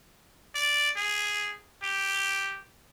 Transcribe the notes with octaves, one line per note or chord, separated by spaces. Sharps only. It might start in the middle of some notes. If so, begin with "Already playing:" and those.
D5
G#4
G4